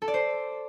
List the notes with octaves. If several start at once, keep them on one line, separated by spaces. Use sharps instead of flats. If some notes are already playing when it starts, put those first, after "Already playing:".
A4
D5
C5